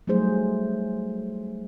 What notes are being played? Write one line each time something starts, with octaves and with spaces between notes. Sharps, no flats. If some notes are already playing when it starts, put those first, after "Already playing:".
F#3 G3 A3 D#4 G#4 C5